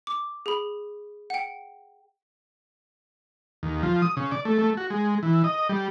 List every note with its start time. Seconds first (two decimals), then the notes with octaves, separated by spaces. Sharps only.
0.07 D6
0.46 G#4 B5
1.30 F#5 G5
3.63 D#2
3.83 F3
4.02 D#6
4.17 C#3
4.32 D5
4.45 A3
4.59 A3
4.77 F#4
4.90 G#3
5.23 E3
5.44 D#5
5.69 G3